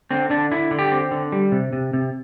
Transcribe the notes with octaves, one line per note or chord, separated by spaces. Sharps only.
D3 C4
D3 D4
D3 E4
D3
G4
C4
D3
G3
C3
C3
C3